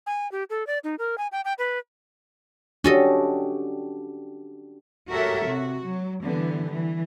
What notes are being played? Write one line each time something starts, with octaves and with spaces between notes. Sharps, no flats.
G#5
G4
A4
D5
D#4
A#4
G#5
G5
G5
B4
C#4 D4 F#4 G4 A4 D#5
F#4 G4 A4 A#4 C#5 E5
C3 F#4
F#3
D3 E3 G3 B3
E3